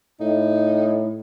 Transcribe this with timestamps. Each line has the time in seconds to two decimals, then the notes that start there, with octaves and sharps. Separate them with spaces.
0.20 A2 D#4